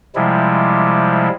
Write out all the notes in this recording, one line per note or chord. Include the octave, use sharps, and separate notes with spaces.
C3 F3 G3 G#3 E4